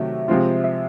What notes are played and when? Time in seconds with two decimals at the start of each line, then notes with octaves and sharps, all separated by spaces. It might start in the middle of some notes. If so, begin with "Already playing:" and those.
Already playing: C3 D#3 F#3 A3 C#5 E5
0.28 C3 F3 G#3 C4 F4
0.64 E5